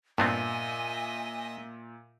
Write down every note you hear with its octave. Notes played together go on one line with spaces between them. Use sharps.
G2 A#2 B3 C4 D#5 E5 G#5